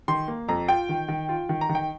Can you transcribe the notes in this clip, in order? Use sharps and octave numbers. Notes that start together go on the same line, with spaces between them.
D#3 C6
A#3
F2 A#5
F4 G5
D#3
D#3
F4
D#3
A#5
D#3
G5